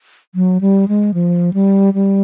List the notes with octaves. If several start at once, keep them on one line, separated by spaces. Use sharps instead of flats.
F#3
G3
G#3
F3
G3
G3